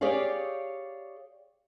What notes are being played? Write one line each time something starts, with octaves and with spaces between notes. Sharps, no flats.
G4 G#4 C#5 D5 F5